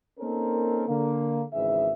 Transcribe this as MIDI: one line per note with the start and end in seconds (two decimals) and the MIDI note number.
0.19 0.87 58
0.19 0.87 60
0.19 0.87 61
0.19 0.87 63
0.19 0.87 69
0.19 0.87 70
0.87 1.43 50
0.87 1.43 58
1.53 1.91 32
1.53 1.91 44
1.53 1.91 49
1.53 1.91 52
1.53 1.91 68
1.53 1.91 76